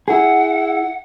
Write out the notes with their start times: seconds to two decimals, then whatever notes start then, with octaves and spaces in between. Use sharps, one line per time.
0.08 E4 G#4 F#5